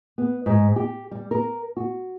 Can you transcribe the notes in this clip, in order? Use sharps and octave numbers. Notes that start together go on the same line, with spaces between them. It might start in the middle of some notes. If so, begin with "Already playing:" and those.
B3
G#2
G4
G3
A#4
F#4